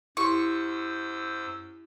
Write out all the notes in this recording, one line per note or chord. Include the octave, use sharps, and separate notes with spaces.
F#2 E4 G4 C5 C6 C#6 E6